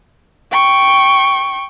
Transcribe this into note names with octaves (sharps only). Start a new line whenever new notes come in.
G5 C#6